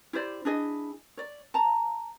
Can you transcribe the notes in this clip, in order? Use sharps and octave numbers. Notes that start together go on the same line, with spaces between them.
E4 G4 C5 D5
D4 E4 G#4 D#5
C#5 D5
A5 A#5